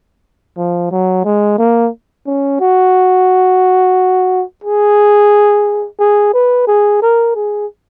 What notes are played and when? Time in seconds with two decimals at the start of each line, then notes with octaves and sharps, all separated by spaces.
0.57 F3
0.91 F#3
1.25 G#3
1.58 A#3
2.26 C#4
2.60 F#4
4.64 G#4
5.99 G#4
6.33 B4
6.67 G#4
7.02 A#4
7.36 G#4